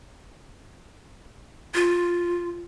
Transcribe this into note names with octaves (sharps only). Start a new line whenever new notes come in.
F4